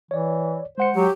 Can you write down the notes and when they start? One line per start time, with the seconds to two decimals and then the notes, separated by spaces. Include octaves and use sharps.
0.11 E3 C#5 D5
0.78 G#3 C5 F#5 C#7
0.96 F#3 G4